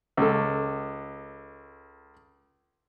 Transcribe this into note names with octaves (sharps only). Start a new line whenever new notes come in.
C#2 A4